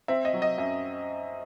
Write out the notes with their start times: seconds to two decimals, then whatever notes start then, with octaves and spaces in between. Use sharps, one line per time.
0.08 C4 E5
0.25 D#5
0.33 F#3
0.42 D#5
0.58 F#2 E5